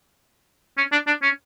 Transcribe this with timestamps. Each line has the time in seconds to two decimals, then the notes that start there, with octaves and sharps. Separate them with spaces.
0.77 C#4
0.92 D4
1.07 D4
1.22 C#4